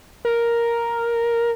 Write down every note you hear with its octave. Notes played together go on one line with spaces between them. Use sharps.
A#4